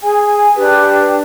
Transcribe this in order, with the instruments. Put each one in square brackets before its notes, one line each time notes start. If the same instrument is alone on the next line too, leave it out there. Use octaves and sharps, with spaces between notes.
[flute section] G#4 [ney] G#5
[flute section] D4 G4 [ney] B4